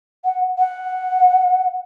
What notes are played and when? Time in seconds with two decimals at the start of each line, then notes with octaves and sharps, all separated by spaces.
0.25 F#5
0.58 F#5